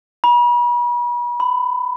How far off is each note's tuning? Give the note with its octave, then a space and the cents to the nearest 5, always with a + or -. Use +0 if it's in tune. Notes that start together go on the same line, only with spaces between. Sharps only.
B5 -40
B5 +20